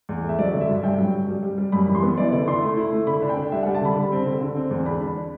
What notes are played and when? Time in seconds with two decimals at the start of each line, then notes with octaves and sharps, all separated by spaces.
0.09 E2
0.24 A3
0.29 E5
0.39 F#3 D5
0.53 D3
0.61 E5
0.69 G2
0.83 G2 G5
0.98 F#3
1.13 G2
1.28 G3
1.43 G3
1.58 G3
1.72 F#2 B5
1.88 E3
1.95 C6
2.03 B3
2.17 E4 D5
2.32 D3 D5
2.48 E4 C6
2.63 A3
2.77 E4
2.92 A3
3.07 D3 B5
3.22 D4
3.29 G5
3.37 D4
3.52 G3 E5
3.63 F#5
3.66 G3
3.75 A5
3.81 D3 B5
3.96 D3
4.12 C4
4.26 D3
4.41 D3
4.56 C4
4.71 E2
4.85 D4 B5
5.01 D4